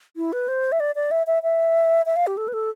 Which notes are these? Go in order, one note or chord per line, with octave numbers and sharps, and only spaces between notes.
E4
B4
C5
E5
D5
D5
E5
E5
E5
E5
F5
G4
A4
B4
A4